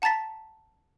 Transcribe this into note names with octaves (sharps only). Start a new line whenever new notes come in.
F#5 A5 A#5 A6 B6